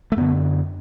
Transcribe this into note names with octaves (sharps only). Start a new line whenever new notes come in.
A3
F#2 D3 B3